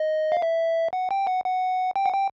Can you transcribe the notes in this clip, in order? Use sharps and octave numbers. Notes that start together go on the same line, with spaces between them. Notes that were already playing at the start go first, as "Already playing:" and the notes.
Already playing: D#5
F5
E5
F#5
G5
F#5
F#5
G5
F#5
G5